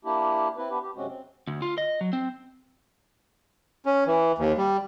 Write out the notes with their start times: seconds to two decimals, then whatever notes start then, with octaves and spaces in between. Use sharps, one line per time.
0.05 A#3 D4 E4 G4
0.57 C4 E4 B4
0.70 B3 D4 G4 B4
0.82 G4
0.96 F#2 C3 G#3 C4 C#4 F#4
1.07 C4
1.47 D2
1.62 F4
1.78 D#5
2.01 F#3
2.13 C4
3.86 C#4
4.07 E3
4.38 D#2
4.57 G3